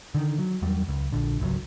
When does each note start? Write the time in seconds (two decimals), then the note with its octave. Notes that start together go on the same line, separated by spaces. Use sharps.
0.15 D3 D#3
0.38 F#3
0.62 E2 F#3 G3
0.88 C#2
1.12 A#1 D3
1.40 G#1 C#2 F#3